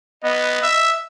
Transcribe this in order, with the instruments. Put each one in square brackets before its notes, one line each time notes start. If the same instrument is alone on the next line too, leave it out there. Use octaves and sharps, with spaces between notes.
[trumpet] B3 [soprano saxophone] D#5
[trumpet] E5